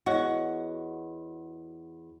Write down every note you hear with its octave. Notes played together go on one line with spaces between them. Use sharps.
E2 F#4 C#5 D#5 F#5